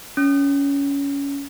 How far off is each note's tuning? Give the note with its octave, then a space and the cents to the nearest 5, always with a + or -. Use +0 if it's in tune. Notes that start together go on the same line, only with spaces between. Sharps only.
C#4 +20